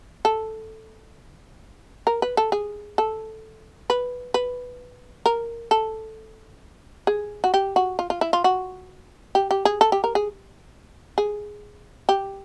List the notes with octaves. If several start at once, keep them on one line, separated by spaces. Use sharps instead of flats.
A4
A#4
B4
A4
G#4
A4
B4
B4
A#4
A4
G#4
F#4
G4
F#4
F4
F4
E4
F4
F#4
G4
G4
G#4
A4
G4
A#4
G#4
G#4
G4